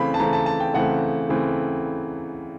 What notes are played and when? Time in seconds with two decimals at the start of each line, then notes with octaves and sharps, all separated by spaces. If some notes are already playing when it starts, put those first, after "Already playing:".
Already playing: C#3 E3 A3 C4 B5
0.14 A5
0.20 C#3 E3 A3 C4 A#5
0.33 A5
0.46 A5
0.60 G5
0.74 C#3 E3 A3 C4 F#5
1.29 C#3 E3 A3 C4